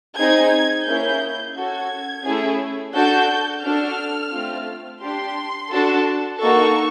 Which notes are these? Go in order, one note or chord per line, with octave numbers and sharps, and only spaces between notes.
C4 D#4 G#4 G#6
A#3 C#4 E4 G#4 G6
C#4 F#4 A4 G#6
A3 C#4 E4 G#4
D4 F#4 A4 G6
D4 F#4 A4 F6
A3 C4 F4
D4 G4 C6
D4 F#4 A4
A#3 D#4 F#4 A4 C#6